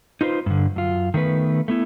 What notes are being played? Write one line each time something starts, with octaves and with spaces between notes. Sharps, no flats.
D#4 F4 B4 C5
G2 D3
F#2 F4
D#3 A3 B3 B4
A3 B3 E4